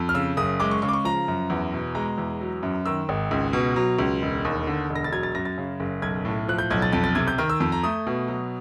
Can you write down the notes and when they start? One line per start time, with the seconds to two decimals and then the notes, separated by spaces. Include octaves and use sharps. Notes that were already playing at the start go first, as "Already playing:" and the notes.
Already playing: F2
0.09 F6
0.14 C#3 E6
0.37 F#1 D#6
0.60 G#3 D6
0.71 C#6
0.82 C#3 C#6
0.89 D6
0.93 C#6
1.05 F3 A#5
1.28 F#2
1.50 E2
1.73 B2
1.95 G#3 A#5
2.18 E2
2.41 F#3
2.63 F#2
2.86 D#3 E6
3.09 G#1
3.31 C#2
3.53 B2
3.76 F#3
3.99 C#2
4.22 E1
4.45 D#2
4.67 D3
4.90 E1
4.96 A#6
5.04 A6
5.12 F#3 G#6
5.23 A6
5.35 F#2 A#6
5.45 A6
5.58 C#3
5.80 F#1
6.02 B1 G#6
6.25 A2
6.48 F3 F#6
6.58 G6
6.70 B1 G#6
6.82 A6
6.93 F2 A6
7.04 A6
7.15 C3 G#6
7.28 G6
7.38 D#3 F6
7.50 E6
7.60 F2 E6
7.72 A#5
7.84 A3 D#6
8.07 B2
8.28 F#3